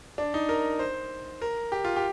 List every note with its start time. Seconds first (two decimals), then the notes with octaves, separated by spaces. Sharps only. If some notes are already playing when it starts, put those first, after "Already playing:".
0.18 D4
0.34 D#4
0.49 A#4
0.79 C5
1.42 A#4
1.72 G4
1.85 F4
1.96 G4